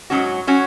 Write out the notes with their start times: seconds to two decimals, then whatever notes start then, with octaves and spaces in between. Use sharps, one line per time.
0.10 G#2 F#3 C#4 F#4
0.47 F#3 C#4 F#4